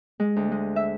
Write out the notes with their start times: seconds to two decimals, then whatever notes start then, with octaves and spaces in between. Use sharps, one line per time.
0.20 G#3
0.36 D2
0.51 G#3
0.76 E5